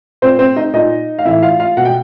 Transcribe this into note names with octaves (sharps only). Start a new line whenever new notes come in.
A#2 C4 C5
C4 C5
D#4 D#5
A#2 D#4 D#5
F5
A2 E3 E4 E5
F4 F5
F4 F5
B2 F#5
G5